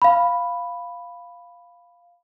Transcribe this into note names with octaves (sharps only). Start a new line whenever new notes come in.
F5 B5